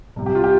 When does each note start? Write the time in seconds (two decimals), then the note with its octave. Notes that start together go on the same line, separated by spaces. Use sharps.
0.16 C2 C3
0.26 G4
0.35 F4
0.44 G4